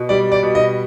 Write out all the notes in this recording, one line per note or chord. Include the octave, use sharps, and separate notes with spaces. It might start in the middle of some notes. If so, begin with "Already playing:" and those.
Already playing: B2
G3 D5
D5
B2
D#5